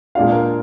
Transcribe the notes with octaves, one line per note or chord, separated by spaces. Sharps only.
A#2 G#3 D4 F4 F5
A#4